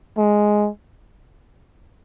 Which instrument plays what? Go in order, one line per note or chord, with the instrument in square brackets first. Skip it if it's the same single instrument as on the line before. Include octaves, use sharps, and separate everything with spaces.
[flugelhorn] G#3